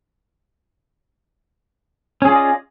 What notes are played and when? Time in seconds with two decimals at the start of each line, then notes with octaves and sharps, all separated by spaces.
2.22 C#4
2.25 G#4
2.29 F4
2.32 D5
2.36 D#5